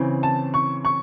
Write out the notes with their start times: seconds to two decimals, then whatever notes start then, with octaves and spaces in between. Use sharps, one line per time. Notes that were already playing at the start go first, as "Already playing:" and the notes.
Already playing: C#3 E3 C4
0.23 A5
0.54 C#6
0.85 C#6